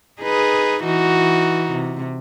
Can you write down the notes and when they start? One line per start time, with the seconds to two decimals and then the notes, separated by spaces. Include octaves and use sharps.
0.21 D#4 G#4 B4
0.84 E3 D#4 F#4
1.72 C3